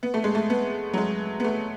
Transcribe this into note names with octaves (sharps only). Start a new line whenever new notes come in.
B3
A3
G#3
A3
B3
F#3
G#3
B3
A3